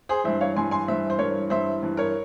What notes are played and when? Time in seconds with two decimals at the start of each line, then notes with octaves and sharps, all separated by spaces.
0.09 G#4 C5
0.24 G2 E3 C5 E5
0.41 C#5 F5
0.56 G2 E3 G#5 C6
0.71 G#5 C6
0.87 G2 E3 C5 E5
1.10 C5
1.19 G2 E3 A#4 C#5
1.50 G2 E3 C5 E5
1.83 G2 E3
1.97 A#4 C#5